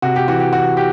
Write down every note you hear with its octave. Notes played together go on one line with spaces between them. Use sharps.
C3 F#4
G4
E3 F#4
G4
E3 F#4
G4